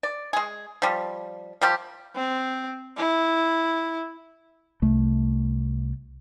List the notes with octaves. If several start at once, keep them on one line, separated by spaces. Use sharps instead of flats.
D5
G#3 G#4
F3 G3
F3 G3 G4
C4
E4
C2 A3